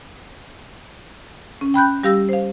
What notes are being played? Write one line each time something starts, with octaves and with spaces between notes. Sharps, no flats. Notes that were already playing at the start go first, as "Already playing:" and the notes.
C#4
G5 B5 F#6 G6
G3 G4 F5 E6 A#6
C5 F5